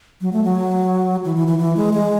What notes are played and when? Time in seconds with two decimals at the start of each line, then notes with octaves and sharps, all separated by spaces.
0.21 F#3
0.33 A3
0.44 F#3
1.25 E3
1.36 E3
1.47 E3
1.59 E3
1.77 G#3
1.94 G#3